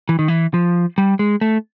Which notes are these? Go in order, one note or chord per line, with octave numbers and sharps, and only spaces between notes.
E3
D#3
E3
F3
G3
G#3
A3